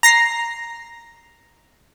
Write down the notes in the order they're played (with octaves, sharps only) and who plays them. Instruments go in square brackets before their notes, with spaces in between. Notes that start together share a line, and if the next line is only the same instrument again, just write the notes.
[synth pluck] A#5 A#6 C7